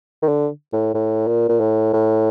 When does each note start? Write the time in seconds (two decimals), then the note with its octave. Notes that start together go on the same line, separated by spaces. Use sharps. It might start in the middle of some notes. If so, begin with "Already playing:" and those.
0.22 D#3
0.28 D3
0.73 A2
0.94 A2
1.27 A#2
1.49 A#2
1.60 A2
1.93 A2